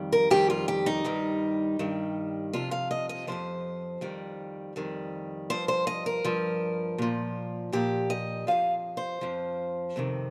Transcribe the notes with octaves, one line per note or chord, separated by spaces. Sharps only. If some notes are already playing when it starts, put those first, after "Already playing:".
Already playing: F2 D#3 G3
A#4
F2 D#3 G3 G4
F4
G4
D#4
G2 D#3 G3
G2 D#3 G3
F2 C3 F3 F4
F5
D#5
D#5
F2 C3 F3 C5
F2 D#3 G3
F2 D#3 G3
G2 F3 C5
C5
D#5
A#4
G2 F3
A#2 F3
A#2 F3 G4
D#5
F2 F3 F5
C5
F2 F3
F2 C3 D#3